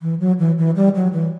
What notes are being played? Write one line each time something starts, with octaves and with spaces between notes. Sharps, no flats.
E3
F#3
E3
E3
G3
F#3
E3